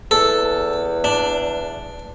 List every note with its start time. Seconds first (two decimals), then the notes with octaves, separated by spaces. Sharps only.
0.11 E2 A4
1.04 D4